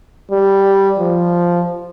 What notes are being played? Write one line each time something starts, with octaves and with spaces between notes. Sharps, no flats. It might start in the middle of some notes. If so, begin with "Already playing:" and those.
G3
F3